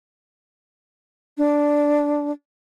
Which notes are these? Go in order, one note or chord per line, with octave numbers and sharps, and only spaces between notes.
D4